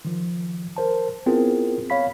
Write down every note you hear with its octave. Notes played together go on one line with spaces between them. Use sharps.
D#3 F3
A#4 C5 A5
B3 C4 E4 F4 G#4 A#4
C#5 F5 B5 B6